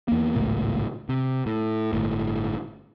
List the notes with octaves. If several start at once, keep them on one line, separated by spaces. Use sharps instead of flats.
E2 A#3
G#1 C#2 A2
C3
A2
G1 A2